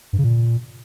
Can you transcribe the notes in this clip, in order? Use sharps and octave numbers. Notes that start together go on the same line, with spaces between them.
G2
C#3
A#2